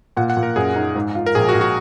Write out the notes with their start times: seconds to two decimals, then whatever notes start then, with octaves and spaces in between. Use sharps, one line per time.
0.17 A#2 F#5
0.30 F#5
0.37 A#2
0.43 A#4
0.56 F#2 G#4
0.76 D#4
0.95 G#2
1.15 F4
1.26 A#4
1.35 A#1 G#4
1.49 F#4
1.55 A#1
1.61 F#4